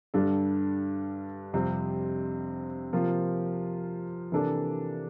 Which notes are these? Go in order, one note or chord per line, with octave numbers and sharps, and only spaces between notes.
G2 D3 G3 D4 A4
F2 C3 G3 C4
C3 F3 A#3 F4
C3 E3 A#3 D4 A4